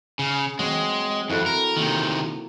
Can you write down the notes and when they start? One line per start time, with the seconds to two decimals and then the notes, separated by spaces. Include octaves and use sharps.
0.19 C#3
0.59 F#3 G#3 C4
1.30 F2 E4 F#4 A4
1.46 A#4
1.76 C3 D#3 A#3